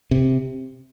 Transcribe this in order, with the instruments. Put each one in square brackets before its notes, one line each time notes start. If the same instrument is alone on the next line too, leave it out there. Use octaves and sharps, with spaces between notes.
[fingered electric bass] C3